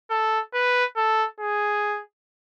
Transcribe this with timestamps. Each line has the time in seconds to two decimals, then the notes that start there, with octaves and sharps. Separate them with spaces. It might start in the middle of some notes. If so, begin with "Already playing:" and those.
0.10 A4
0.54 B4
0.96 A4
1.40 G#4